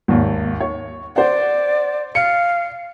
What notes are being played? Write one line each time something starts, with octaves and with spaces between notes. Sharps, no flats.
G#1 D#2
C#5
C5 D5 F#5
F5 C#7